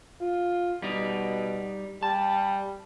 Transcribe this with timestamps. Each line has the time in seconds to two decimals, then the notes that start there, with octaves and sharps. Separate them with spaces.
0.21 F4
0.82 B2 G3 D#4
2.03 G3 A5